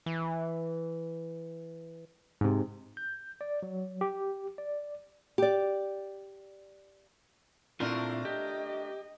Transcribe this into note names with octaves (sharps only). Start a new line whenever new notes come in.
E3
G#2 C3
G6
D5
F#3
G4
D5
G4 D5
A#2 A3 C4 D4 E4 F4 A#4
G4 D#5